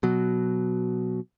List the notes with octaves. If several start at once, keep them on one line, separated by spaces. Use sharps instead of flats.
B2 F#3